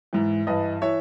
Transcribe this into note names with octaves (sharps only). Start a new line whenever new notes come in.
G#2 E3
G2 E3 B4 D#5
E3 C#5 E5